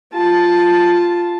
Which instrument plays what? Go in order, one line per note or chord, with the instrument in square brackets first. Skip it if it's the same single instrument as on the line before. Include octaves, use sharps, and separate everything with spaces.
[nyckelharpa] F4 A5